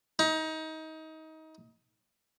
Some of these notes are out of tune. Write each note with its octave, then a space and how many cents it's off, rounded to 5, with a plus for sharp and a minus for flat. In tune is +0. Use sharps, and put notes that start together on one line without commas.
D#4 +25